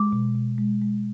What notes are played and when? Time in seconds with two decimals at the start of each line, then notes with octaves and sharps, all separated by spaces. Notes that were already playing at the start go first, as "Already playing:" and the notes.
Already playing: G#3 D6
0.13 B2
0.35 B2
0.58 G#3
0.82 G#3